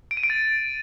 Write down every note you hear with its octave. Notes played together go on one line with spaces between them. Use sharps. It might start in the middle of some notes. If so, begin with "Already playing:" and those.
D7
D#7
D7
A6